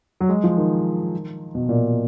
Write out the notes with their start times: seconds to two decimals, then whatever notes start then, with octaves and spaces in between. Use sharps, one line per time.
0.21 F#3
0.29 G#3
0.44 F3
0.57 D#3
1.55 B2
1.69 A#2